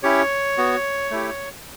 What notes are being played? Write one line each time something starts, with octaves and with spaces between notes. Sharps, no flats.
C#4 E4 G4 C#5
B3 F#4
A3 E4 G4